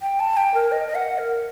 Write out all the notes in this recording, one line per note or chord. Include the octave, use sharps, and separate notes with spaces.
G5
A5
G5
A#4
D#5
D#5
F#5
A#4